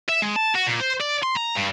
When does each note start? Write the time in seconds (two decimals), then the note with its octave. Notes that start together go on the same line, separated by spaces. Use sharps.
0.09 E5
0.22 G#3
0.36 A5
0.56 F#4
0.67 A#2
0.81 C5
1.01 D5
1.23 C6
1.36 A#5
1.55 G2